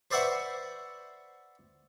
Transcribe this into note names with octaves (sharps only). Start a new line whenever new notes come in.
B4 C5 D5 E5 F#5 C#6